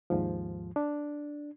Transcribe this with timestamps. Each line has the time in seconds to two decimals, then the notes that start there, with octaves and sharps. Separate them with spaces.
0.10 D#2 G#2 F3
0.76 D4